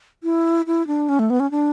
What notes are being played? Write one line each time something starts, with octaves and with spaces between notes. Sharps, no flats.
E4
E4
D4
C#4
A3
B3
C#4
D4